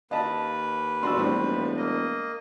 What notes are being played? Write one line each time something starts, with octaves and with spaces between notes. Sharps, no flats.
D#2 B4 D#5 F5 A5
E1 D4 F#4 C6 E6
A2 G3 C4
A#3 D#5